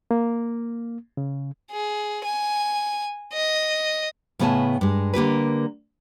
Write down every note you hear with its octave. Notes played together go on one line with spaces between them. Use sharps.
A#3
C#3
G#4
G#5
D#5
A2 C#3 B3 C#5 G#5 A5
G2 G#3
D3 A#3 G4 B4